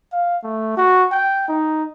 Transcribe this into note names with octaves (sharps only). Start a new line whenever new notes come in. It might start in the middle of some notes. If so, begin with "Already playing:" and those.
F5
A3
F#4
G5
D#4